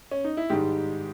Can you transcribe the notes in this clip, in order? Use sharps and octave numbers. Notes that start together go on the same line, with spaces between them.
C#4
D#4
E4
G#2 D#3 G3 G#3 G4